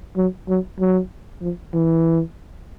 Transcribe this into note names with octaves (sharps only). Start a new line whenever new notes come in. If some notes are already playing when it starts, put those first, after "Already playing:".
F#3
F#3
F#3
F3
E3